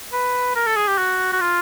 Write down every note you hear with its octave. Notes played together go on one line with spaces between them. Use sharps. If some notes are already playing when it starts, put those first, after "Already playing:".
B4
A#4
A4
G#4
G4
F#4
F#4
F4